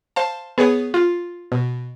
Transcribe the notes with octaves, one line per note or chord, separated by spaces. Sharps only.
C5 F5 A5
B3 G#4 B4 C#5 F#5
F4
B2